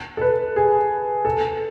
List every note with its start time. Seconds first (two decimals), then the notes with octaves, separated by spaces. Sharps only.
0.17 A4
0.21 B4
0.56 G#4
1.25 A4